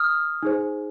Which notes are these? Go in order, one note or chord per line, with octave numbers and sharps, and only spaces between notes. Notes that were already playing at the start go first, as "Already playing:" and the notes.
Already playing: D#6 F6
D#4 G#4 C5